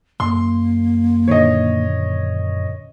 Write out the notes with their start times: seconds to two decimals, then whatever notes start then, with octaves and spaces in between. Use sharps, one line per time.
0.20 F#2 A#3 C6
1.28 A#2 D3 D#3 C#5 D#5